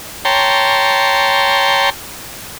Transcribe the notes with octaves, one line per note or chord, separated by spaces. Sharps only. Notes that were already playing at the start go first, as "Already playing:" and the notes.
C#5 G5 A5 A#5 C6